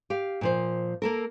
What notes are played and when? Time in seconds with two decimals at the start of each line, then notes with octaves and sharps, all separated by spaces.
0.10 G4 F5
0.41 A#2 F3 C5
1.02 A#3 A4 A#4